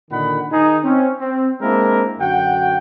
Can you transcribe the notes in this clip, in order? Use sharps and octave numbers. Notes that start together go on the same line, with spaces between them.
A#2 D3 D#3 D#4 F#5 B5
D#3 D#4 G#4
C4 C#4
C4
G#3 A#3 C4 D4 E4 A#4
F#2 D3 F#4 F#5 G5